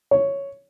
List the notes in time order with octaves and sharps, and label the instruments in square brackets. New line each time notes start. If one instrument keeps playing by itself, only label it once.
[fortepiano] C#5